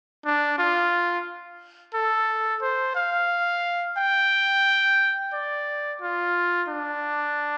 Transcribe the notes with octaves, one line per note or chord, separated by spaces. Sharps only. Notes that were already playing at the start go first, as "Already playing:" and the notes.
D4
F4
A4
C5
F5
G5
D5
F4
D4